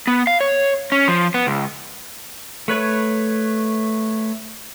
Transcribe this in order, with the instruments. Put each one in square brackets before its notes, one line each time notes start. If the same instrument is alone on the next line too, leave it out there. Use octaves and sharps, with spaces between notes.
[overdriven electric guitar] B3
F5
C#5
C#4
F3
B3
C#2
[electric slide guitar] A3 B4 C#5